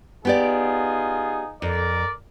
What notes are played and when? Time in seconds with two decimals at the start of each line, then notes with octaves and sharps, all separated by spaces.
0.25 B3 D#4 F4 G4 G#4 D5
1.62 F2 A#4 D5